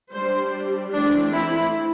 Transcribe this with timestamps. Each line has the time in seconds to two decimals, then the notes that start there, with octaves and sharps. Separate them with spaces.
0.13 G3 D4 C5
0.94 E3 A3 C4 D4
1.34 E4